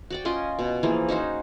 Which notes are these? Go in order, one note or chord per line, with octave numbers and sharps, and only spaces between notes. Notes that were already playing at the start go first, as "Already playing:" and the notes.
F#4 D5 G5
C#4 F4 D#5 C6
B2
E3 F3 A#3 G#4
C#4 D#4 F#4 C5